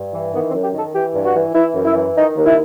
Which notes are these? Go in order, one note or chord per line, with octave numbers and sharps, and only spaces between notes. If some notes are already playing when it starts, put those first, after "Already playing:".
Already playing: G2
E3
D#3 B3
C4
F#2
G4
D#3 A4
E3 G4
G2
F#4
E3
E3 E4
F#2
E4
E3
D#3 D#4
D#2
E4